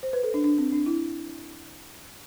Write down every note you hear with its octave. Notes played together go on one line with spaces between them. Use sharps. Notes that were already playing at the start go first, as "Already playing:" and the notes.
C5
B4
A4
D4
D4
C4
D4
E4